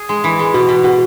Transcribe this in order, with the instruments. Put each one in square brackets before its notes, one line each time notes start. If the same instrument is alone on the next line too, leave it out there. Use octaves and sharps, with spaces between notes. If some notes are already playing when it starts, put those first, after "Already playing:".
Already playing: [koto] G#4
G#3
E3
G#3
[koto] B2 [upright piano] F#4
[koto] B2
[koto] B2 [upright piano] F#4